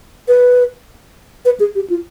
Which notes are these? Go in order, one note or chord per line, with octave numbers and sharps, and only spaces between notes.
B4
B4
G#4
G4
F4